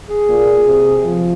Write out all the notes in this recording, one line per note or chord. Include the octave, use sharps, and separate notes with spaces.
G#4
A#2
C3
F3